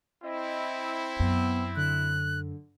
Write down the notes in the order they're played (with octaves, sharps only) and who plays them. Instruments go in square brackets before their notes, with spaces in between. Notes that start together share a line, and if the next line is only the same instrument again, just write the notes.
[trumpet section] C4 E4 [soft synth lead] D#5
[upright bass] F#2 [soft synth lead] B3
[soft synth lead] D3 [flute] F#6